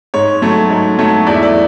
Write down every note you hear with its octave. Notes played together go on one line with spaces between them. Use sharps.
G#2 C#5
F#3 A3
G#2
F#3 A3
E2 D5
E5
D5